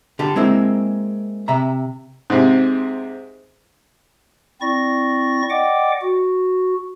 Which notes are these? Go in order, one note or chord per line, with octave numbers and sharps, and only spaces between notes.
D3 G4 A4
G#3 A#3 C4 E4
C3 E5 A#5
G#2 C3
C4 E4 D5 C#6 A#6
D5 D#5 F#5 G5 D6
F#4